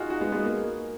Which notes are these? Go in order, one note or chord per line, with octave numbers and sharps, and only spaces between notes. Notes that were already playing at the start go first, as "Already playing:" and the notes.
Already playing: D#4 F4 F#4 G#4
D#4 F#4
G#3 B3
G#3 B3
A#3